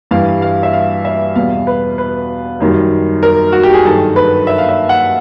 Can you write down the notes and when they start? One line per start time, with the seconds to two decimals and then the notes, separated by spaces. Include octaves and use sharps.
0.11 G2 E3 G3 F5
0.42 F5
0.63 E5
0.73 F5
1.05 E5
1.35 E2 B2 G3 F5
1.67 B4
1.98 B4
2.60 F#2 D#3 G3
3.23 A#4
3.52 F#4
3.63 G4
3.74 G#4
3.85 G2 D#3 F#3 A4
4.16 B4
4.47 E5
4.58 F5
4.69 E5
4.89 F#5